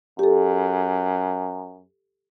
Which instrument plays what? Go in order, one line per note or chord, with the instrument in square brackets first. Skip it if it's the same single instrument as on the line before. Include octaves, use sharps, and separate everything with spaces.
[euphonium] F#2 [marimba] G4 A4